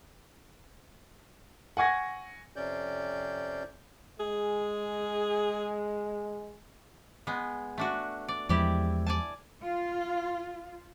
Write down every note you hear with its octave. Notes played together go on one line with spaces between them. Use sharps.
F#5 G#5 C#6 G#6 A#6
F2 C3 C#4 D5 G6
G#3 G#4
G#3 B3
A3 D4 F#4
D5
E2 F3 G#3 E4 G4 D5
D5 G#5 A5
F4